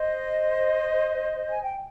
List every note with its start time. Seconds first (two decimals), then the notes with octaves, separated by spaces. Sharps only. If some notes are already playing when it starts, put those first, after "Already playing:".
Already playing: C5 D#5
1.50 G#5
1.63 G5